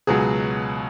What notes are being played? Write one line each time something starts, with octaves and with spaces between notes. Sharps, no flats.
C#2 B2 F#3 G#4